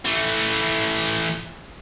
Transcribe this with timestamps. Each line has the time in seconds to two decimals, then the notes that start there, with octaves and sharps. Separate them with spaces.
0.06 E3 A3